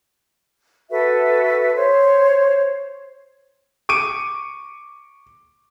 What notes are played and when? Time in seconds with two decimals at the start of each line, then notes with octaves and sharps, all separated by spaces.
0.90 F#4 A4 B4 E5
1.76 C5 C#5
3.89 C#6 D6 D7 D#7